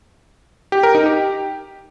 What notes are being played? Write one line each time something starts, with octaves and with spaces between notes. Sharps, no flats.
G4
A#4
D#4
G4